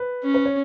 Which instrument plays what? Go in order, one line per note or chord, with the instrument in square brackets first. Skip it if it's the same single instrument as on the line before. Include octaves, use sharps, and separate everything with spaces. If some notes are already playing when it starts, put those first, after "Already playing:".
Already playing: [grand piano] B4
[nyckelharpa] C#4
[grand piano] B4
C#5